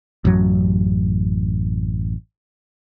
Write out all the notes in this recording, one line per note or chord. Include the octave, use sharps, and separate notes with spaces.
A1 F#2 F#3